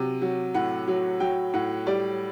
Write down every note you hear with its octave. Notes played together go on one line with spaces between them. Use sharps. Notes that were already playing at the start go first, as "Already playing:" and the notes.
Already playing: C3 F#3
F#3
A2 F#5
F#3
F#3 G5
A2 F#5
G3 D5